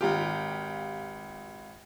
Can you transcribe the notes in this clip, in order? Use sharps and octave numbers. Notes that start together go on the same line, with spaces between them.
G#1 F4 G4